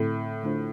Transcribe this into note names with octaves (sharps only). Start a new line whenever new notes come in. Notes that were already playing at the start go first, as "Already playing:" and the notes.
Already playing: A2 D3 A3 C4
D3 A3 D4 F4 C5